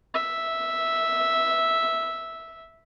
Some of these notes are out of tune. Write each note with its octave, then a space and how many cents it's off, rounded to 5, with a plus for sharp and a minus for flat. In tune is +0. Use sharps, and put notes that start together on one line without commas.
E5 -5